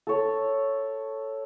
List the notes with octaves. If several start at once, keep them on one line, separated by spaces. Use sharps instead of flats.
A4 C#5